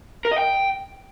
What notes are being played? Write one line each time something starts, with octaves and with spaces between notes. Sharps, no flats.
A#4
D#5
G5